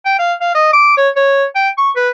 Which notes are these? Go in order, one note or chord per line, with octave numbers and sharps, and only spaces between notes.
G5
F5
F5
D#5
D6
C#5
C#5
G5
C#6
B4